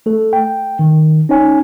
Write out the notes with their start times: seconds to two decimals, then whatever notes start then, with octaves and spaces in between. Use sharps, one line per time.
0.06 A3 A4
0.33 G5
0.79 D#3
1.29 C#4 D#4 C#5 G#5